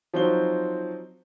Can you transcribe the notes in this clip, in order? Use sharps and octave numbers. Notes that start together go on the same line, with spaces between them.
F3 F#3 C4 D#4 F#4 G7